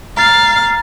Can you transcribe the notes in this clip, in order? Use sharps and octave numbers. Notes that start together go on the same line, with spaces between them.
F5 A#5 A6